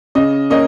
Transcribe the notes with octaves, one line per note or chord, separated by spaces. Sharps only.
C#3 D#5
A#3 C#4 D#5